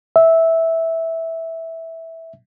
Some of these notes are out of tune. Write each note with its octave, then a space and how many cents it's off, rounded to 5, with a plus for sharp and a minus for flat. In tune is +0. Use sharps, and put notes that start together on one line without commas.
E5 -10